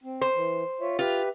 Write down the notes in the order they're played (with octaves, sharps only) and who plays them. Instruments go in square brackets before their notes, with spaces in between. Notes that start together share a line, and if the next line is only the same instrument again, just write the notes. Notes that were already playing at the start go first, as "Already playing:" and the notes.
[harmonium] C4
[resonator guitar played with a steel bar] C5
[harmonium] E3
F4 C#5 E5
[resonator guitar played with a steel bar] F4 [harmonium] G4 B4 E5